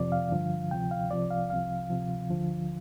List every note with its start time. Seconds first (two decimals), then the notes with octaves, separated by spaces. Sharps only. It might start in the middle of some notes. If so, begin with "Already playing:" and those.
Already playing: F2 C3 F3 D5
0.12 F5
0.31 G2 D3 F3
0.71 D2 C3 F3 G5
0.91 F5
1.11 C2 C3 F3 D5
1.31 F5
1.50 C2 C3 F3 F5
1.90 D2 C3 F3
2.30 D2 D3 F3